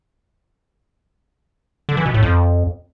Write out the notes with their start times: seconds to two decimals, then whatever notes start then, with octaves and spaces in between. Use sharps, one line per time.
1.89 D3
1.97 E3
2.06 B2
2.14 A2
2.23 F2